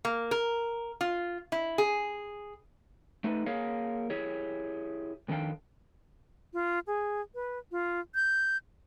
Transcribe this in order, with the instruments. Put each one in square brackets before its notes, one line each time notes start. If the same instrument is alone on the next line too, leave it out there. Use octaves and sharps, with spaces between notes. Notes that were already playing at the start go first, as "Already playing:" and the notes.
[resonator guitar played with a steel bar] A#3
A#4
F4
E4
G#4
[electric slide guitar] A3 D#4 A4 B4
A#3 G#4 A#4 C#5 F5
E4 G4 G#4 C#5
F2 D#3 D4 A4 F5 G5
[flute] F4
G#4
B4
F4
G6